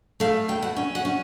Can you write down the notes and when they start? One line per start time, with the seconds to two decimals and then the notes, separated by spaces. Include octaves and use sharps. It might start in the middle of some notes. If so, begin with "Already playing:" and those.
0.20 A3 F5
0.48 E2 G5
0.62 F#5
0.77 C#4
0.95 F#5
1.05 C#4